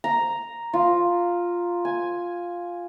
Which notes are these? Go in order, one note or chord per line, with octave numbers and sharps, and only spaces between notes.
A#5
F4
G#5